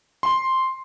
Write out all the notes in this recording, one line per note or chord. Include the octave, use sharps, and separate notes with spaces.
C6